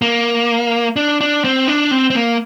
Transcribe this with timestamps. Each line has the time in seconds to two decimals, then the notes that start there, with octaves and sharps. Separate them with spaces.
0.02 A#3
0.96 D4
1.21 D4
1.44 C4
1.68 D4
1.91 C4
2.10 C4
2.15 A#3